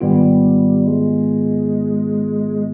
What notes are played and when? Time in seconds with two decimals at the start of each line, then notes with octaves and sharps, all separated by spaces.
0.01 G#2 D#3 G3 B3 F4
0.87 G#3